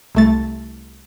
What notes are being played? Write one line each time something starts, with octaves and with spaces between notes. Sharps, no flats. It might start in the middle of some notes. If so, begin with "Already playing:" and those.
C2 A3 A6